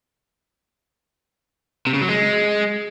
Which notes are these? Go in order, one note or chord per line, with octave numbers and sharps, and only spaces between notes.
C3
C#3
F#3
G#3